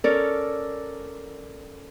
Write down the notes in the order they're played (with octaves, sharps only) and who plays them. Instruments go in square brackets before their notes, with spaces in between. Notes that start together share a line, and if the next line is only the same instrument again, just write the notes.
[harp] C#4 A4 A#4 C#5 D5